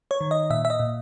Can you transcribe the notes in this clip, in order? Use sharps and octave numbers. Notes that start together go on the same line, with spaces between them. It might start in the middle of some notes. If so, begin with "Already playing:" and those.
C#5
D#3
D#5
A#2 E5
E5
D#5
A#2